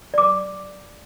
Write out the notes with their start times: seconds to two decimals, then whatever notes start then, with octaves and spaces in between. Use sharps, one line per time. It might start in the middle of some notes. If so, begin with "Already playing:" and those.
0.14 D5 D6